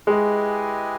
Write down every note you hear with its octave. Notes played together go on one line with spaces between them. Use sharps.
G#3 E4 G4 B4 D#5 G#5